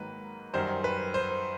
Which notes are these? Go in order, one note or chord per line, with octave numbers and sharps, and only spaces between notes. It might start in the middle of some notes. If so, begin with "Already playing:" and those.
Already playing: G#2 D#3 F#3 A#3 B4
F#2 D#3 G3 C5
B4
C5